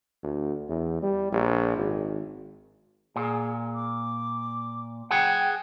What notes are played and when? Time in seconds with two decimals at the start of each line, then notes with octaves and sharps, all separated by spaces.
0.23 D2
0.69 E2
1.02 G3
1.33 A#1
1.77 G#1
3.16 A#2 G#4
3.74 D6
5.11 G#4 F#5 G5